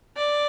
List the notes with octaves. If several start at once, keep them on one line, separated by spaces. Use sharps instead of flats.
D5